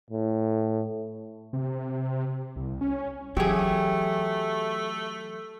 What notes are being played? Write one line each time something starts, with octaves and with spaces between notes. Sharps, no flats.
A2
C3
C2
C#4
E3 F#3 A3 G4 G#4